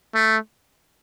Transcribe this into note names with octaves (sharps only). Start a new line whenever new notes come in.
A3